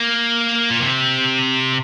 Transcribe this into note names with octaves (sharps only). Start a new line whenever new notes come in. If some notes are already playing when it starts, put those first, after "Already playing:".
Already playing: A#3
A#2
C3